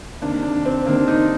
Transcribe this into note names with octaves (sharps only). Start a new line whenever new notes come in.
C3 D#3 A#3 D4
D4
C4
C3 D#3 A#3 D4
D#4